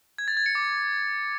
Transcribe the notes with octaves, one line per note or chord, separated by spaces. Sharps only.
G#6
A6
G#6
C#7
D6